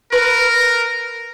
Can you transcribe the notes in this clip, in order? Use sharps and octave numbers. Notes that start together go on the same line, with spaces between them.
A#4 B4